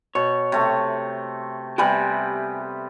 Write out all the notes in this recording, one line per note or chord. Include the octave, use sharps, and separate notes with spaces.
B2 C#5
C3 A3
C3 G3 B3 G4 G#5 B5